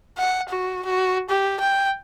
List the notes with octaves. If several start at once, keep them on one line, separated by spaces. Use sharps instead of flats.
F#5
F#4
F#4
G4
G5